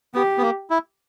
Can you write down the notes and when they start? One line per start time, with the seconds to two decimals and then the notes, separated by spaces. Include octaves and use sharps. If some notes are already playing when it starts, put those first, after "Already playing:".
0.14 B3 G4
0.38 B3
0.42 A#3
0.70 E4